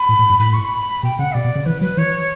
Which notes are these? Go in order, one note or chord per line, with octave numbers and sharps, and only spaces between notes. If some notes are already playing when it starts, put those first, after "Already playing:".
Already playing: B5
A2
A2
G2
A2 B5
C#6
B5
B2 G5
C#3 F#5
B2 D5
B2
C#3
E3 B4
F#3 B4
E3 C#5